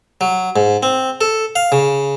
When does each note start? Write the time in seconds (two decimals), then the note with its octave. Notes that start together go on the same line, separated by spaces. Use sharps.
0.21 F#3
0.56 G#2
0.83 C4
1.21 A4
1.56 F5
1.72 C#3